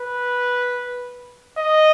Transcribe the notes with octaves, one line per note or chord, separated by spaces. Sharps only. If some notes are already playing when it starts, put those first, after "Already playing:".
Already playing: B4
D#5